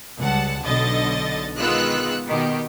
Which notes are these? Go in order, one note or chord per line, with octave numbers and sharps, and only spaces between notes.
C#2 G3 F#5 A5
B1 D3 D#5 A6
D#3 G#3 B3 F4 E6 F#6
B2 D#3 G4